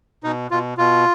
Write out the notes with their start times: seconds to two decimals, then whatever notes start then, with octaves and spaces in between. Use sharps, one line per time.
0.24 B2 D#4
0.51 B2 F4
0.78 B2 F4